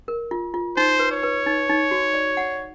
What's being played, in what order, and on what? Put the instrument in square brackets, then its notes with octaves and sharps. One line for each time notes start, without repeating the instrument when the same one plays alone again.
[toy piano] A#4
F4
F4
[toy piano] D#4 [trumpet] C5
[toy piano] B4
[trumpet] C#5
[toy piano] B4
D#4
D#4
F#4
D5
F#5